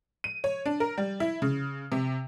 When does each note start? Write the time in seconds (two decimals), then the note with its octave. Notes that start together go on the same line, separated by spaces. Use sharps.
0.24 D#7
0.44 C#5
0.66 D4
0.80 A#4
0.98 G3
1.20 E4
1.42 C#3
1.92 C3